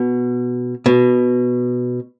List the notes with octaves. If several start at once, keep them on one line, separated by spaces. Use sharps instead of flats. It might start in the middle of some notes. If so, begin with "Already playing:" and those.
Already playing: B2
B2